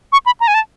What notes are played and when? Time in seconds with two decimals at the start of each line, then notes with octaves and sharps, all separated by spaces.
0.12 C#6
0.26 B5
0.40 A#5
0.48 G#5
0.54 A5